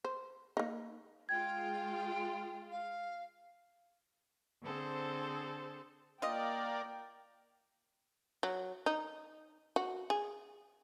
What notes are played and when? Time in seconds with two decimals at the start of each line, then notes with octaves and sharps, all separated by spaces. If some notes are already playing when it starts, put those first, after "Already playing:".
0.05 C5
0.57 A#3 D#4
1.29 G#3 F4 G5 G#6
2.71 F5
4.62 D3 C4 G#4 A4 C5
6.22 A#3 F4 A#4 D5 D#5 G5
8.43 F#3
8.86 D#4
9.76 F#4
10.10 G#4